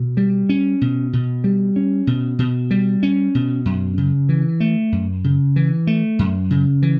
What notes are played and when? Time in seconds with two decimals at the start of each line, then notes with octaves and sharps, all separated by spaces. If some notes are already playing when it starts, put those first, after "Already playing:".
Already playing: B2
0.17 G3
0.49 C#4
0.81 B2
1.13 B2
1.44 G3
1.76 C#4
2.07 B2
2.39 B2
2.71 G3
3.03 C#4
3.35 B2
3.65 F#2
3.98 C#3
4.29 E3
4.60 A3
4.92 F#2
5.24 C#3
5.56 E3
5.87 A3
6.19 F#2
6.50 C#3
6.82 E3